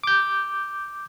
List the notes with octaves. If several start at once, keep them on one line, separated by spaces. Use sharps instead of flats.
D6 G6